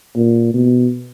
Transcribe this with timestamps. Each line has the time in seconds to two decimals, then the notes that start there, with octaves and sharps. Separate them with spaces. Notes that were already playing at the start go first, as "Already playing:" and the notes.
0.17 A#2
0.54 B2